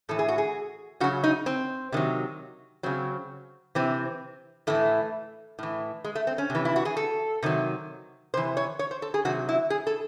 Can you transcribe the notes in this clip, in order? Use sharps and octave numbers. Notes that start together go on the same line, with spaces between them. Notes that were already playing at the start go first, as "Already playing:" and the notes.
A2 E3 A4
G#4
F#4
G#4
C#3 F#3 F#4
D#4
C4
C3 D#3 F#3
C#3 F#3 C4
C3 E3 C4
A2 E3 A3
A2 E3
G#3
A3
C4
C#4
C3 E3
E4
F#4
G#4
A4
C3 D#3 F#3
C3 E3 C5
C#5
C#5
C5
A4
G#4
C3 D#3 F#3 F#4
E4
G#4
A4